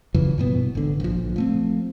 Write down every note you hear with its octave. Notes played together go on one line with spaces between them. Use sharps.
F#2 C#3 E3 F3
G2 B2 B3
G#1 D3
A#1 F3
F3 A3 C4